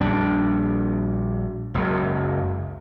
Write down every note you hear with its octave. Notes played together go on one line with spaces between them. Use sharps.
A#1 G3 D4
F#1 C#2 F#2